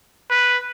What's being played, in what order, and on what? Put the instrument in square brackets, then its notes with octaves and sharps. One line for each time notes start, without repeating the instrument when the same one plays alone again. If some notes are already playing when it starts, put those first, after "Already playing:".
[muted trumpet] B4